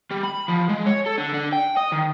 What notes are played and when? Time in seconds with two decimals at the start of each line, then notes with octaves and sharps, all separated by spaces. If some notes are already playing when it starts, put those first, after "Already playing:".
0.11 G3
0.24 B5
0.49 F3
0.70 G#3
0.87 C#5
1.06 A4
1.18 D3
1.34 D3
1.53 G5
1.77 D#5
1.92 D#3